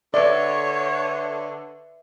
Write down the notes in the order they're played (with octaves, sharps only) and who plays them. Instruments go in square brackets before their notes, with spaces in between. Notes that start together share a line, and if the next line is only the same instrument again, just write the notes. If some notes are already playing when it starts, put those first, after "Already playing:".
[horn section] D3 [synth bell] B4 E5 [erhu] C#5 [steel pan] D5